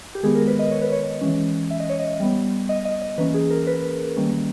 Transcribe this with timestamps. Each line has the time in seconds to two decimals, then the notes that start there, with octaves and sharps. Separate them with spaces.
0.15 G4
0.23 D#3 G#3 B3 G#4
0.35 A#4
0.47 B4
0.59 D#5
0.71 C#5
0.81 B4
0.92 C#5
1.21 E3 G#3 C#4
1.70 E5
1.80 D#5
1.89 C#5
1.99 D#5
2.20 G3 B3
2.69 D#5
2.85 D#5
3.02 D#5
3.18 E3 A#3 C#4 B4
3.34 G#4
3.50 A#4
3.67 B4
4.16 D#3 G3 A#3 C#4